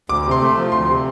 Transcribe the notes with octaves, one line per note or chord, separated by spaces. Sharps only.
D2 D6
C3
C6
A3
F3
D2 C6
C3